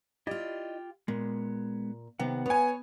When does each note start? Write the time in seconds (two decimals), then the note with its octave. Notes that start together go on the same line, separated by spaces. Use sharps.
0.27 E4 F4 G4 D5 D#5
1.08 A#2 G#3 B3
2.19 C3 D#3 B3 F#5
2.46 B3 C#5 G#5